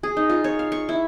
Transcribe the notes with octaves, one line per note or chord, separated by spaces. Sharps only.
G#4
D#4
F4
C#5
F5
C#6
E4